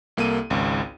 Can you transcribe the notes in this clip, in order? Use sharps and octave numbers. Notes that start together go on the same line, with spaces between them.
C2 A#3 A4 D#7
G#1 C#2